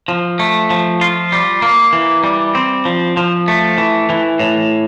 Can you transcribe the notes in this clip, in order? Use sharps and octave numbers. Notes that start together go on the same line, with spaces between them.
F3
A3
F3
F4
G3
A#3
E3
G3
C4
F3
F3
A3
E3
E3
A2